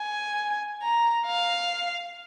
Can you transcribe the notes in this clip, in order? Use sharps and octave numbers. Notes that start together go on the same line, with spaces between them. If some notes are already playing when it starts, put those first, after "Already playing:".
Already playing: G#5
A#5
F5